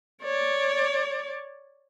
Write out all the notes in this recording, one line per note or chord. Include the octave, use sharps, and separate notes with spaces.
C#5 D5